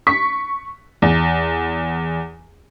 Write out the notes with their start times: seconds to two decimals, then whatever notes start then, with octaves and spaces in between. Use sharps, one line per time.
0.07 C#6 B6
1.02 E2